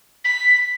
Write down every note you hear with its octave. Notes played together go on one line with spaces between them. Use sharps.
B6